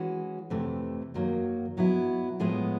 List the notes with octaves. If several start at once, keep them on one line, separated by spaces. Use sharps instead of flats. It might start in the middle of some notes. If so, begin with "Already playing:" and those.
Already playing: E3 G#3 C#4 F#4
F2 C3 E3 A3
F#2 D#3 F#3 A#3
B2 F#3 B3 E4
A2 F3 G#3 B3 E4